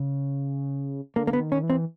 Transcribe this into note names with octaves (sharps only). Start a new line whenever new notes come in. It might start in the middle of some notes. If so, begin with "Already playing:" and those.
Already playing: C#3
D3 A#3
A#3
B3
D#3
C#4
E3
C4